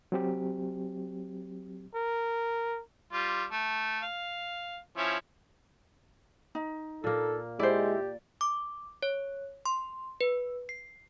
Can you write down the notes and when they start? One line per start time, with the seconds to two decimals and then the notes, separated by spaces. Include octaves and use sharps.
0.12 F#3 C4 G4
1.95 A#4
3.13 G3 F4
3.52 A3
4.03 F5
4.97 F3 C#4 E4
6.55 D#4
7.04 A#2 A#3 A4
7.59 G#3 E4 G4 C5 D5
8.41 D6
9.03 C#5
9.66 C6
10.21 B4
10.69 C7